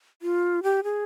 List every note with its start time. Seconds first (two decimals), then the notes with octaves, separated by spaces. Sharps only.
0.22 F4
0.63 G4
0.84 G#4